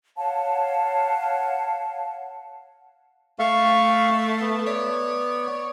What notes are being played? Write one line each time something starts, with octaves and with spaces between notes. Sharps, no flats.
C#5 F5 F#5 A5
A3 F5 C#6
B3
C#5 D5